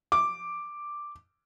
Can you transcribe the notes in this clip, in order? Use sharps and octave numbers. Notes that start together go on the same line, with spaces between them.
D6